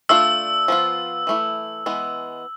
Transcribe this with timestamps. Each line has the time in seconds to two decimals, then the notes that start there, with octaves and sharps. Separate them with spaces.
0.09 A3 D4 F4 E6
0.68 F3 B3 F4
1.27 E3 A3 E4
1.86 E3 G#3 B3